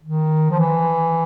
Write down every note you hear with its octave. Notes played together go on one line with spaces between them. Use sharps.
D#3
F3
E3